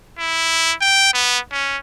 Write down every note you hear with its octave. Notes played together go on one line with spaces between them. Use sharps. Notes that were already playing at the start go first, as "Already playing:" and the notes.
E4
G5
B3
C#4